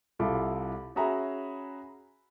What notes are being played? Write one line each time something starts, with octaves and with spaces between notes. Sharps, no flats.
C2 E4 F4 A4 B5 D6
C#4 F#4 G#4 E5 A#5 B5